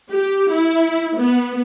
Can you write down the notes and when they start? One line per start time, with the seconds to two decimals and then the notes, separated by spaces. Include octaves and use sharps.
0.12 G4
0.52 E4
1.17 B3